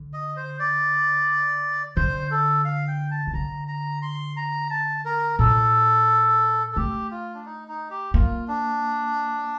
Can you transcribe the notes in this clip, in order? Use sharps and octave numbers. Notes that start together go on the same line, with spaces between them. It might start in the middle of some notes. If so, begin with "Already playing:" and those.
Already playing: D3
D#5
C5
D5
D3 C5
A4
F5
G5
A5
D#3
D3 A#5
A#5
C6
A#5
A5
A#4
A#2 A4
A4
A3 G4
F4
D4
D#4
D#4
G4
A#3 F4
D4